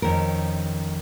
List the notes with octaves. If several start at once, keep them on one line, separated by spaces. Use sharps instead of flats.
F2 D#3 C#4 A#4